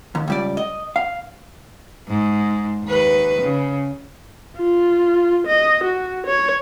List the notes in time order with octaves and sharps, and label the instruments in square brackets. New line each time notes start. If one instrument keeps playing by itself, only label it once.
[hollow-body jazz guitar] D#2
C#2 G3 D5
D#5
F5
[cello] G#2
D#2 B4
C#3
[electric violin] F4
D#5
F#4
C#5